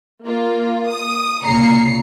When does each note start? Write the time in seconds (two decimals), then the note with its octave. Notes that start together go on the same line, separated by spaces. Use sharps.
0.24 A#3 F4
0.89 D#6
1.44 C2 A#2 C#3 A#5 C7 C#7